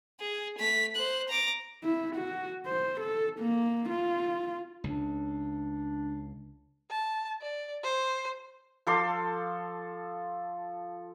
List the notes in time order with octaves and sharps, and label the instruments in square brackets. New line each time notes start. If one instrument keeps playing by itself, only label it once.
[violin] G#4
A3 B6
C5 F#6
A#5 D6
[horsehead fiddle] E4
F#4
C5
A4
A#3
F4
[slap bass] C#2 [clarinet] D4
[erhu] A5
D5
C5
[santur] F3 A4 C6 D6